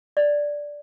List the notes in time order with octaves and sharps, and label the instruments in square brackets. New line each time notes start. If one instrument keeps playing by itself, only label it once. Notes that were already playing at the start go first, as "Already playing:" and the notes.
[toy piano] D5